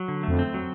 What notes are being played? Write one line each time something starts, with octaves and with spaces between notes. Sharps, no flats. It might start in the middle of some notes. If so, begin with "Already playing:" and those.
Already playing: F#3
D3
A3
F2
C4
F#3